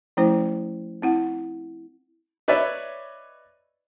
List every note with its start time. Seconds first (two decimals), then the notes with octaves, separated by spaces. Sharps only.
0.17 F3 A3 C#4 E4 C5
1.02 C4 E4 F#5
2.48 D#4 B4 C#5 D5 E5